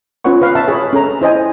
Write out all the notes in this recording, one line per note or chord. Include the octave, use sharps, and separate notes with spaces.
C#4 F4 B4 C#5 F#5 C#6
B4 F5
C#5 E5 A5
G#4 C#5 B5
C#4 A4 A#5
E4 C5 D#5 G#5